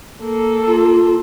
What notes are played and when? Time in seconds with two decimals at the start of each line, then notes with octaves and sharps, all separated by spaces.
0.22 A#3 A4
0.67 F4